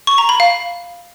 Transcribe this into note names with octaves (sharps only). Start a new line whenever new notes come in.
C#6
A#5
B5
F5